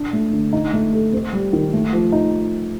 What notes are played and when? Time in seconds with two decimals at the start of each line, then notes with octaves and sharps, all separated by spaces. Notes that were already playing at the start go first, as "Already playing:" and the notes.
Already playing: D4
0.13 A3
0.33 D3
0.53 D#4
0.73 A3
0.92 A4
1.13 C4
1.33 G3
1.53 D#3
1.73 A3
1.93 F3
2.12 D#4